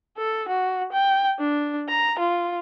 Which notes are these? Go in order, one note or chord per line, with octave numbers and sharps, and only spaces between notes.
A4
F#4
G5
D4
A#5
F4